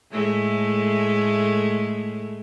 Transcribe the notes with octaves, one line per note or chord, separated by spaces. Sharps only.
A2 G#3 A3